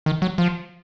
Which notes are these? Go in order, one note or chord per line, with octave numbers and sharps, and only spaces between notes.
D#3
F#3
F3